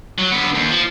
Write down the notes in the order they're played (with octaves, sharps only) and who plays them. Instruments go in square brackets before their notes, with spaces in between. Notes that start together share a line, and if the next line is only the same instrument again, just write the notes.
[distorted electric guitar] F#3
D3 B3
D#2
F3